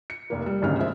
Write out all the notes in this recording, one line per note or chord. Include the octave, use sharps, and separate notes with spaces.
C#7
F1 A#3
G3
D#1 G#1 D2 C#3 D#4 F6
F3 G#3 C4 E5